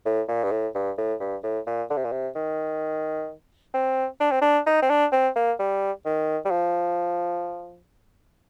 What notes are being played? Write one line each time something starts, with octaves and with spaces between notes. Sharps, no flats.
A2
A#2
G2
A2
G2
A2
G2
A2
A#2
D3
C3
A#2
C3
D#3
C4
D4
C4
D4
D#4
C4
D4
C4
A#3
G3
D#3
G3
F3